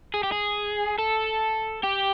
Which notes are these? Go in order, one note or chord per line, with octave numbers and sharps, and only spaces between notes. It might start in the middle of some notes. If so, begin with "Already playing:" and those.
G#4
G4
G#4
A4
G4